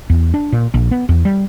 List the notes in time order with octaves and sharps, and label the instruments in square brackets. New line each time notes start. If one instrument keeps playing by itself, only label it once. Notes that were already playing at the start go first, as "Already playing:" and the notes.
[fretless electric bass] E2
D4
A#2
A#1
B3
E2
G3